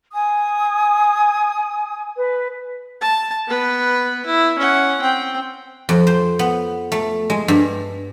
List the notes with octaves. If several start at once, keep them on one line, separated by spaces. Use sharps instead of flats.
G#5 D#6
B4
A5
B3 B4
E4
C#4 F#5
C4 G5
F2
C5
B3
A3
G#3
G2